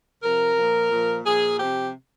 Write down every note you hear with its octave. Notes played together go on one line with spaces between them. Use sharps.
C3 F3 A#4
A#2 F3
A#2 F3
A#2 F3 G#4
C3 F3 G4